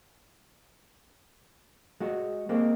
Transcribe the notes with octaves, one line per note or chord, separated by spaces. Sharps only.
G#3 F#4
G#3 A#3 C4